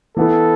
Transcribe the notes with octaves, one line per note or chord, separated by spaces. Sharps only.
E3 B3 E4 A4